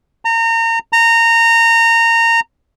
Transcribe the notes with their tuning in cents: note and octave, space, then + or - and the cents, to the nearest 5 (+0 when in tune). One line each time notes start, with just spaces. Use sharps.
A#5 -30
A#5 -20